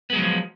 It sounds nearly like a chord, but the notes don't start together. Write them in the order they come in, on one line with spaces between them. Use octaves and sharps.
B3 G#3 F#3 D#3 F3